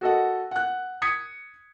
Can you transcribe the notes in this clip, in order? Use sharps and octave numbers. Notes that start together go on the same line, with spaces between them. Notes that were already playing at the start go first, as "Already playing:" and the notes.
F#4 A4 D#5 F#5
F#5 F#6
D#6 G#6 B6 C#7